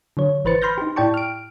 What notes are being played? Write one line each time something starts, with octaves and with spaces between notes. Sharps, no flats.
D3 F#3 C#5
G#1 E3 B4 C5 A6 C#7
B5 C6 F6 G6 A#6
D#4 G4
A2 E4 D5 G5 A5 C#6
F6 D7